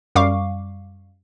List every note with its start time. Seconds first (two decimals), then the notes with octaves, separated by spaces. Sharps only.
0.15 F#2 G3 F5 C#6 D6